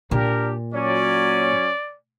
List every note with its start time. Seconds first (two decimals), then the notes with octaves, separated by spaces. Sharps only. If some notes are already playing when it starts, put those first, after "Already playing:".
0.11 A#2 D4 G4 A#4
0.74 F#3 C#4 D5